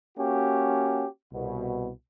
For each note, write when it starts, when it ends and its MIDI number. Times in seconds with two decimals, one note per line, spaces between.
0.18 1.05 58
0.18 1.05 61
0.18 1.05 66
0.18 1.05 67
1.33 1.89 36
1.33 1.89 47